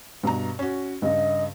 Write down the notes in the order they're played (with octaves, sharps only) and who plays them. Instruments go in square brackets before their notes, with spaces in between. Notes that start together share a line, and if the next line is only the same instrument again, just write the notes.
[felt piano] G2 B2 A#5
C#4 F#4
[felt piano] G2 C#3 [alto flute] D#5